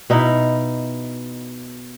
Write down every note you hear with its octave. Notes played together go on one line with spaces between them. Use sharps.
B2 D#4 E4